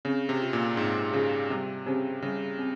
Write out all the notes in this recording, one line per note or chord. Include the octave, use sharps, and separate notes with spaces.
C#3 C4
C3
F4 G#4
A#2
G#2 C4
C#3 F4 G#4
C3 G3
C#3 C4 G4 C5
C#3 G3
C4